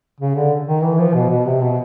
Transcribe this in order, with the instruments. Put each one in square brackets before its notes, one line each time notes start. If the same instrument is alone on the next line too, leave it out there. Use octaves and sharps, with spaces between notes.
[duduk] C#3
D3
D#3
E3
F3
B2
B2
C3
B2